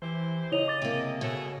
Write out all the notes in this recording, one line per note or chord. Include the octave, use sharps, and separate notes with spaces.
E3 E4 G4 C5
C#3 E4 C#5 D#5 F7
D6 A6
C3 A#3
B2 G#4 A4 C#5